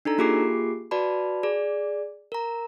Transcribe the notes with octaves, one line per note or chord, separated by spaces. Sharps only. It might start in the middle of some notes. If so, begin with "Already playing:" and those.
D4 D#4 A4 A#5
A#3 F4 G4 G#4 D6 C7
F#4 B4 D5 A5 B5
G#4 D5
A#4 A#5